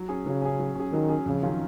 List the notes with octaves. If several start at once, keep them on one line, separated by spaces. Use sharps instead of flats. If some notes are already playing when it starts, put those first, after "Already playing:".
Already playing: F#3
C#4 G#4
C#3 F#3
C#4 G#4
F#3
C#4 G#4
D#3 F#3
C#4 G#4
F2 C#3
D#3 F#3 C#4 F4